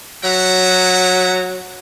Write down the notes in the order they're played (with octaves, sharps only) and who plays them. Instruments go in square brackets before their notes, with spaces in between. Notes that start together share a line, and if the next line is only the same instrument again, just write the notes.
[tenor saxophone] F#3 [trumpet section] E5 F#5 A#5